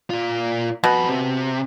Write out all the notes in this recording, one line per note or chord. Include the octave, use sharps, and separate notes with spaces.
A#2 F4
F2 B2 B5
C3